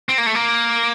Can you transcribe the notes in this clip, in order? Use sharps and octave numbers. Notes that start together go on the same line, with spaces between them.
C4
A#3
A3
A#3